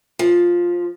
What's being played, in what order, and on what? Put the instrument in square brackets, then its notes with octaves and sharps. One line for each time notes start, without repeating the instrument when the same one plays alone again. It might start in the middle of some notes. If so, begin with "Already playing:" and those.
[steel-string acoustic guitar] F3